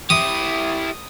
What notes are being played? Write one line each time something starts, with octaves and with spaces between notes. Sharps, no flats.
E4 G4 D#6